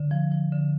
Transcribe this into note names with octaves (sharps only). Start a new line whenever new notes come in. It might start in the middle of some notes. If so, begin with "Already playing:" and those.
Already playing: D3
F3
F3
D3